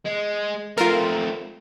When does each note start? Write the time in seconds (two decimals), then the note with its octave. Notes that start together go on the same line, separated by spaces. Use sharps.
0.06 G#3
0.78 A3 C4 F4 A#4